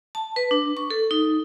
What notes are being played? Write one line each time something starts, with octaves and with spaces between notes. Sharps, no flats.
A5
B4
D4
C#6
A4
D#4